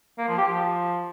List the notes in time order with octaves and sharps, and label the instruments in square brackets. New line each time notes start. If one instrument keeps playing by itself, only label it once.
[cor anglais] A#3
F3
G4
F3